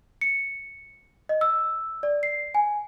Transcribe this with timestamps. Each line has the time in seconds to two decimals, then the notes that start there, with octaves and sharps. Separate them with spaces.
0.21 C#7
1.29 D#5
1.41 E6
2.03 D5
2.23 C7
2.55 G#5